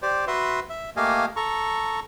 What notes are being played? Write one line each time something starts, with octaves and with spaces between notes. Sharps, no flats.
G4 C5 D5
F#4 B4 E5 C6
E5
A3 A#3 G4 D#5 F5 G#5
A4 A#5 C#6